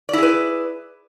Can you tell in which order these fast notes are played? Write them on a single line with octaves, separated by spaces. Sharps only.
D5 E4 G#4 B4